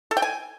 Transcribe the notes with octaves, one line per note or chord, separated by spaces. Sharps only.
A4
G5
G#5